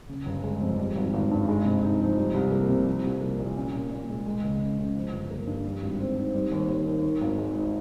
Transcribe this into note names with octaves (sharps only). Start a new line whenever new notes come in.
C#3
G1
G#3
F2
G3
G#1
G#1
G2
G#3
C3
D#4
F3
G3
C2
A#3
C3
F3
C2
A#3
A#2
C#4
A#2
A#2
G#3
G#3
C#2
C#4
C#3
F3
G1
A#3
G2
G3
G#1
C4
G#2
G3
D#2
D#2
D#3
D#3
G#1
G#3
G#2